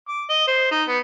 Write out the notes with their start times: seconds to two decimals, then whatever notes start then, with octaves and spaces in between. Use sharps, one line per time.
0.08 D6
0.30 D#5
0.48 C5
0.72 D#4
0.88 B3